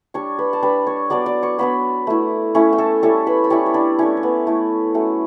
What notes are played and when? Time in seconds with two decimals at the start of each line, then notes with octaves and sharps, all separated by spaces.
0.14 G3 D4 C#5 C#6
0.39 B4 B5
0.53 A5
0.62 G3 D4 B4 B5
0.87 C#5 C#6
1.10 F#3 B3 D4 D5 D6
1.26 D5 D6
1.42 C#5 C#6
1.58 F#3 B3 D4 B4 B5
2.07 A3 E4
2.55 A3 C#4 E4 C#5
2.73 G5
2.78 A4 A5
3.03 G3 C#4 E4 A4 A5
3.27 B4 B5
3.44 B5
3.50 G3 C#4 E4 C#5 C#6
3.66 C#5
3.74 D4 D5
3.99 A3 C#4 E4 C#5
4.17 C#5
4.23 B3 B4
4.47 A3 E4
4.94 F#3 A3 C#4